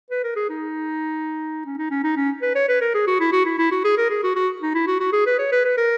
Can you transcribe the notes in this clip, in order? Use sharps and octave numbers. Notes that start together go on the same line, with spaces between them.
B4
A#4
G#4
D#4
C#4
D#4
C#4
D#4
C#4
B4
C#5
B4
A#4
G#4
F#4
E4
F#4
E4
E4
F#4
G#4
A#4
G#4
F#4
F#4
D#4
E4
F#4
F#4
G#4
B4
C#5
B4
B4
A#4